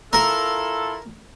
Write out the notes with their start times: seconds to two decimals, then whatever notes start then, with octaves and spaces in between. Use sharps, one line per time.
0.13 E4 F4 A4 A#4